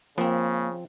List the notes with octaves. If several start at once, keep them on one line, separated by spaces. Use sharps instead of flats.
C#3 F3 A#3 C4